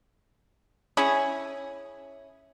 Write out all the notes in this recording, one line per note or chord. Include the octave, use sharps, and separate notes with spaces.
C#4 E4 G#4